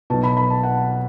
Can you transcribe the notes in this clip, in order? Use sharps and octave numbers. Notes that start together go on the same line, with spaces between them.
B1 B2 A5
B5
B5
A5
F#5